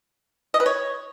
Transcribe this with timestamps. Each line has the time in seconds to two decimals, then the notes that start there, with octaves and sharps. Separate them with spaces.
0.54 D#5
0.60 B4
0.66 C#5